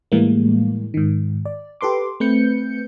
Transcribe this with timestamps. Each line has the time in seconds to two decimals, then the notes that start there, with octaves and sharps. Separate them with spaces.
0.12 A2 E3 G3 G#3 A#3
0.94 G#2 D#3
1.45 D5
1.81 G4 A4 B4 C6 D6
2.20 A3 C4 B4 G6 C#7